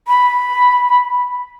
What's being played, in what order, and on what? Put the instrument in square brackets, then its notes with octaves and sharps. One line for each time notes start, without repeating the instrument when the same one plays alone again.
[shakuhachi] B5